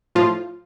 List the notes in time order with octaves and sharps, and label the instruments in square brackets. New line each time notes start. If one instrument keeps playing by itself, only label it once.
[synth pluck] A2 F3 F4